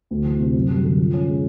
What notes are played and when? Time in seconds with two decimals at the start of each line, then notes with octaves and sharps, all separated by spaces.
0.11 D2
0.25 E3
0.39 C3
0.55 F#2
0.69 G3
0.83 D3
0.99 F3
1.13 C#4
1.28 G#3